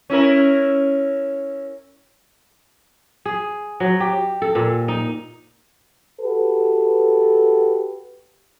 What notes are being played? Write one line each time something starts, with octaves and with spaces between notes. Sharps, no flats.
C#4 E4 A#4
G#4
F#3
G4
A4
A#2
D#4
F#4 G4 A4 B4